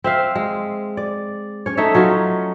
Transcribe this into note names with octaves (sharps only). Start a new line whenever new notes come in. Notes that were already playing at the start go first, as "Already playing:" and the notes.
C4 E5 F5
G#3
D5
C#4 C#5
A3 D#4 C#5 E5
F#3 C#4 D#4 F4